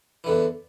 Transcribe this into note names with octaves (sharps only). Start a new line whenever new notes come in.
E2 D3 E3